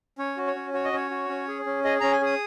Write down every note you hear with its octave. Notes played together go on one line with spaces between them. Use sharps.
C#4 C#5
F#4
C#5
C#4
F#4 C#5
D#5
C#4 C#5
F#4
C#4
G#4
C#4
G#4 D#5
C#4 A#5
G#5
G#4 D#6